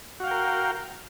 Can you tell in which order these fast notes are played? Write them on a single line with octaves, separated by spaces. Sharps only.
F#4 F5 G5 A#4